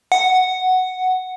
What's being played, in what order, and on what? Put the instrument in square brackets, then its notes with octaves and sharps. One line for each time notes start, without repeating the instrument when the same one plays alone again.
[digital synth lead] F#5